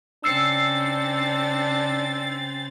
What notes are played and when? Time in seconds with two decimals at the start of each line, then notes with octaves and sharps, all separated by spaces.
0.24 C#3 C4 D4 E6 A6 C7 C#7